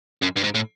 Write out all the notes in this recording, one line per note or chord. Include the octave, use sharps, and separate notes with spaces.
F#2
G2
G#2
A2